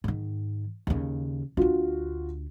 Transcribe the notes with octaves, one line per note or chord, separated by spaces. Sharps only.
G#2 D#3
D#2 C#3
D2 D4 F4 F#4